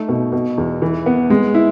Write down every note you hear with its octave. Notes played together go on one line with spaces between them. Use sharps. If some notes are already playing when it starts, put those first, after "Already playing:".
Already playing: A3 D#4
B2
B2
E2
E3
B3
G#3
E4